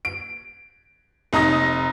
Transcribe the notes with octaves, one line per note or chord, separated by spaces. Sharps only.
D7
F1 D#4 A#5 D#6 A#6